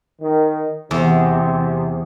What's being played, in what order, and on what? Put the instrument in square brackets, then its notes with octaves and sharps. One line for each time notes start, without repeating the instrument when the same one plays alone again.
[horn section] D#3
[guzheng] E2 [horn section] C3